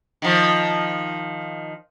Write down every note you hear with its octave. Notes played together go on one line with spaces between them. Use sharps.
D#3 F3